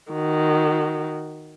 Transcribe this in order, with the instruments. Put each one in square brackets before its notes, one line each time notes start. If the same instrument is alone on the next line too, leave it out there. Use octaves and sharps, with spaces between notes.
[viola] D#3 F#4